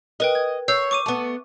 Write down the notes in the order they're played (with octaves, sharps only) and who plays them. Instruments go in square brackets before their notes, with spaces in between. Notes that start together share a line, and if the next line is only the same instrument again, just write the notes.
[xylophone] A#4 B4 G5 [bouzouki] D#5
[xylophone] G#6
[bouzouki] C#5 [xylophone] E6 G6 C7
[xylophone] C#6 D6 D#7
[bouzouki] A3 B3